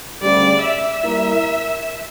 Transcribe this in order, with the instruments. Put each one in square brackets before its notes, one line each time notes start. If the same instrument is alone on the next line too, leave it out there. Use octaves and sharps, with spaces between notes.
[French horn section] D2 C#3 G3 [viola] D5
[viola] E5
[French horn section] G3 A#3 E4 A#4